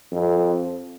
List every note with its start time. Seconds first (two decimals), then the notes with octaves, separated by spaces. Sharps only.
0.12 F2